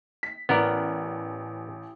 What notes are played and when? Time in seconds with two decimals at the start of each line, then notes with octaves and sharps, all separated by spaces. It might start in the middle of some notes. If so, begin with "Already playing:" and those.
0.23 B6
0.49 A1 B3 A#4 D5